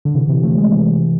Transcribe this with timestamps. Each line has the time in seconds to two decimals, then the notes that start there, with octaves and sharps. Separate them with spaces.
0.05 D3
0.14 C3 E3
0.29 C3 E3
0.43 F3 A3
0.57 E3 G#3
0.71 C3 E3